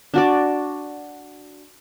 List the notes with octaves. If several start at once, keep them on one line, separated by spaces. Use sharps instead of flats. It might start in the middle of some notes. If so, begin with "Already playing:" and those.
D4 F#4 D5